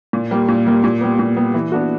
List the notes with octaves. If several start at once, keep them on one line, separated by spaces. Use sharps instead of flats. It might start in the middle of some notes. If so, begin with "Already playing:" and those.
A#2
G3 A#3
A#2
G3 A#3
A#2
G3 B3
A#2
G3 B3
E3
B3 D4 F#4